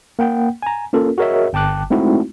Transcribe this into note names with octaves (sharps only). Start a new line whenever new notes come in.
A#3 F#5 G5
G#5 A#5
A#3 C#4 F4 A4 A#4
F#4 G#4 A#4 C#5 D#5 E5
G1 G5 A5 D6 F#6
G#3 A3 C4 D#4 E4 F#4